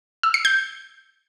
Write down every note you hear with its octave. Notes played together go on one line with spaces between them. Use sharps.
E6
C7
G6